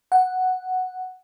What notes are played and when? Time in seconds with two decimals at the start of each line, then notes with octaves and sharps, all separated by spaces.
0.12 F#5